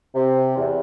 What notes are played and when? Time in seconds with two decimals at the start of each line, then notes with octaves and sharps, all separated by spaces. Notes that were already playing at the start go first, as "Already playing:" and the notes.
0.14 C3
0.56 E2